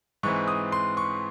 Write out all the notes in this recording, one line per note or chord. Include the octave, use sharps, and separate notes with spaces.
G#2 E3 C4 C#6
D#6
C6
C#6